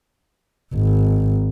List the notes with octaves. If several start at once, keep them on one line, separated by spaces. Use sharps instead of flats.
G#1